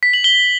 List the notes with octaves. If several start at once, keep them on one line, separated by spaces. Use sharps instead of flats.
B6
F#7
G7